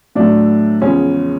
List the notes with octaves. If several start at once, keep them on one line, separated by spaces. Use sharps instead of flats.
A2 F#3 A3 D4
E2 C#3 F3 G#3 C#4